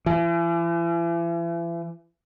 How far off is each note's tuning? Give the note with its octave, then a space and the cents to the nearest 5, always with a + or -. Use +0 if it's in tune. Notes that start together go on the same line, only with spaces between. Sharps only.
E3 +40